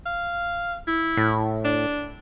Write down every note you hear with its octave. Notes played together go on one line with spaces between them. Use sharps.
F5
E4
A2
D4